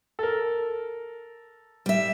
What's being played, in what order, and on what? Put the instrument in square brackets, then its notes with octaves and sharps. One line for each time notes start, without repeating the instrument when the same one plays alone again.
[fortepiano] A4 A#4
[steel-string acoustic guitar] G3 E5